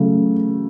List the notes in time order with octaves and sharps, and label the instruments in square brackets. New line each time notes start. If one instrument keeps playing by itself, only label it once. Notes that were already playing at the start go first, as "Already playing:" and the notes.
Already playing: [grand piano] C#3 F#3 A3